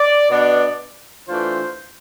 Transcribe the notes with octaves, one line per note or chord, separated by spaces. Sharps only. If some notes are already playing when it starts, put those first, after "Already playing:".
Already playing: D5
B2 B3 D4 D5
E3 A3 D4 F4 C5